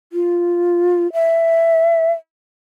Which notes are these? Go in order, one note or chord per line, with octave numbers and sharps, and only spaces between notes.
F4
E5